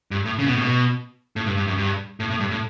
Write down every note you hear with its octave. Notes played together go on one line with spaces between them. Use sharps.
G2
A2
C#3
B2
A2
B2
A2
G2
G2
F#2
G2
A2
A2
G2
A2